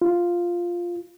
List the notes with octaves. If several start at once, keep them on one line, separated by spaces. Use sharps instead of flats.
F4